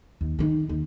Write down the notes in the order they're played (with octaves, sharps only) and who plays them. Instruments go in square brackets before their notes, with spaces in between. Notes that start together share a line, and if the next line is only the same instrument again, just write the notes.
[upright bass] D#2
D#3 D#4
D#2